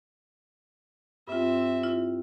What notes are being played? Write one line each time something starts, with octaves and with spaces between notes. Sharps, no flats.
G2 C4 F4 E5
E4 F4